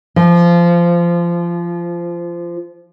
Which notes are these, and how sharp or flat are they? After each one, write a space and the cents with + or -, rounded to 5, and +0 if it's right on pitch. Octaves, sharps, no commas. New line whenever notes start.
F3 -20